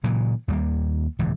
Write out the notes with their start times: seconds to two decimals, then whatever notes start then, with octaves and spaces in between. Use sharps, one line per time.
0.04 A#2 C#3 E3 F#3
0.48 D#2 G3 A3 A#3
1.19 D#1 C#2 A2 E3